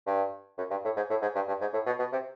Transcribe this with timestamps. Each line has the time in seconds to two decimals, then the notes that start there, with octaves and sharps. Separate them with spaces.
0.07 G2
0.58 F#2
0.70 G2
0.84 A2
0.96 G#2
1.10 A2
1.22 G#2
1.35 G2
1.48 G2
1.61 G#2
1.73 A2
1.86 B2
1.99 B2
2.12 C3